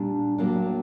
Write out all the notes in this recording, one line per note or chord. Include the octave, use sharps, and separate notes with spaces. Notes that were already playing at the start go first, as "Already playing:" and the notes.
Already playing: A#2 G3 D4
A2 F#3 A#3 D4